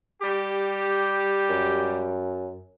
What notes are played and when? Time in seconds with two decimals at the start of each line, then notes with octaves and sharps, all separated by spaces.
0.21 G3 G4
1.50 F#2